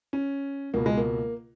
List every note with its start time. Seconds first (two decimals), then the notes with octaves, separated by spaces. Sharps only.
0.13 C#4
0.74 C#2 B2 A#3
0.86 G#3
0.97 A#3